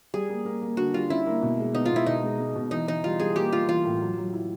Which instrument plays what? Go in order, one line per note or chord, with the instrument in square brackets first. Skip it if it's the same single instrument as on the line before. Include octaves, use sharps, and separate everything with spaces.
[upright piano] G3 [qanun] G#4
[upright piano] A#3
A#3
A#3
[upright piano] D3 [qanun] F#4
[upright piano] G3 [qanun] F4
[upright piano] C#4 [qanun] E4
[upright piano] A#3
B2
G#3
[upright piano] B3 [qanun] D#4
[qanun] F4
[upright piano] B2
[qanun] E4
[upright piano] B2 [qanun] D#4
[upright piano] G#3
G#3
B2
[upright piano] E3 [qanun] D#4
[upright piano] E3 [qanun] D#4
[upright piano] G3 [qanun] F4
[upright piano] G3 [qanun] G#4
[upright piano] A#3 [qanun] G4
[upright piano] A#3 [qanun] F4
[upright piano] E3 [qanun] F4
[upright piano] A2
F#3
F#3
E4